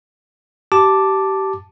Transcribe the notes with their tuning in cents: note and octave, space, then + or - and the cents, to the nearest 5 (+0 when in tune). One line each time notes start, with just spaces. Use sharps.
G4 -25 A5 +0 D6 +0